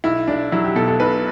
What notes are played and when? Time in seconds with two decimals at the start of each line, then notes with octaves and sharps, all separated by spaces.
0.04 B1 E4
0.27 B1 D4
0.52 F#3 E4
0.64 G4
0.75 B2 A4
0.88 A4
1.00 B1 B4